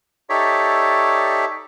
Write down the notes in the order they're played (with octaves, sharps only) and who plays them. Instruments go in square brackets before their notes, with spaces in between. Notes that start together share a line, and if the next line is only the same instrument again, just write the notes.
[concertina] D#4 G4 A4 C#5 D5 E5